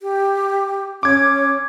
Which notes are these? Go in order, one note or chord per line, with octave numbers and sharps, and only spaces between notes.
G4
C#4 D6 G#6